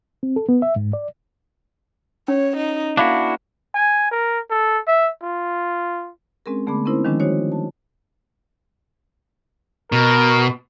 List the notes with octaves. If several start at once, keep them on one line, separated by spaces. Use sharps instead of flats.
C4
A4
B3
E5
G#2
D5
C#4 C#5
D#4
A#3 D4 E4 F#4 F5
G#5
A#4
A4
E5
F4
G#3 C4 C#4 G#4 A#4
D3 A3 B3 G#4 B5 D6
C4 C#4 D#4 E4 A#4 C5
D#3 F3 G3 G#3 C#4 D4
D#4 F#4 C5 C#5
A5
B2 A#4